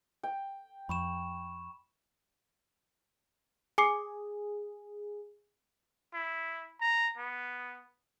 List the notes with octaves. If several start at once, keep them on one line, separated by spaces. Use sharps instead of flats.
G5
F2 B5 C#6 E7
G#4 G#5 D6 C7
E4
A#5
B3